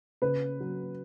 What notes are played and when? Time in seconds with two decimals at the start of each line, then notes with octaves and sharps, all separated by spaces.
0.22 C#3 B4
0.60 F#3